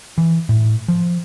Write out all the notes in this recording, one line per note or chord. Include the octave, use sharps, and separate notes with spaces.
E3
A2
F3